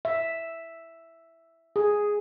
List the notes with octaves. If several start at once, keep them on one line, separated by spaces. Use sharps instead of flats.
E5
G#4